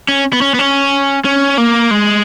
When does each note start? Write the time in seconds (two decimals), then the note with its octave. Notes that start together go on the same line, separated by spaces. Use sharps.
0.08 C#4
0.33 B3
0.42 C#4
0.54 B3
0.59 C#4
1.25 C#4
1.58 A#3
1.91 G#3